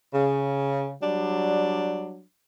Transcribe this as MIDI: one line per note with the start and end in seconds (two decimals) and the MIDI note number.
0.13 0.94 49
1.01 2.23 54
1.01 2.23 55
1.01 2.23 62